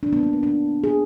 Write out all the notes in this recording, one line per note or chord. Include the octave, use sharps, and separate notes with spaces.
D4
B3
A#3
B3
D4
G#4